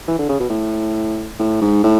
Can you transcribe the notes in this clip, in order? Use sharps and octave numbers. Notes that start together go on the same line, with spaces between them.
E3
D3
C#3
B2
A2
A2
G#2
A2